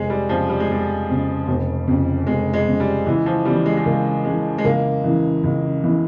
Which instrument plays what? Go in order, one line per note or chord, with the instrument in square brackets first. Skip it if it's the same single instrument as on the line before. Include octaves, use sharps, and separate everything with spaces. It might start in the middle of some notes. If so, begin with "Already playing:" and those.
Already playing: [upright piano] F1 [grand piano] G#3
[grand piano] G3
[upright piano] F2 C#3 [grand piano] F3
[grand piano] G3
G#3
[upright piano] F1 [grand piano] G3
[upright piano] F2 C#3
F1
F2 C#3
[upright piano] F1 [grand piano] G#3
[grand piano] G#3
[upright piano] F2 C#3
[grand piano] G3
[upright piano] C#2 [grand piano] E3
[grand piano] F3
[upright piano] C#3 E3 [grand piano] G3
[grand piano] G#3
G#3
[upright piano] C#2 [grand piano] A#3
[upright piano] C#3 E3 [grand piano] G#3
[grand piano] G#3
[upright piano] C#2 [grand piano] A#3
[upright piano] C#3 E3
C#2
C#3 E3